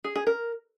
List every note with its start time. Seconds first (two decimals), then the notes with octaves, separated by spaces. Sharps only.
0.04 G#4
0.16 G#4
0.27 A#4